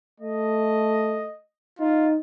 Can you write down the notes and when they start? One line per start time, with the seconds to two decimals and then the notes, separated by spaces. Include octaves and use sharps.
0.20 A3 D#5
1.79 D#4 F4